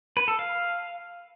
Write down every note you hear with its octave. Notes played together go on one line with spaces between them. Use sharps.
B4
A4
F5